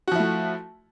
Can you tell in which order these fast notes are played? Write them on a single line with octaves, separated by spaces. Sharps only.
F#4 F3 E4 A3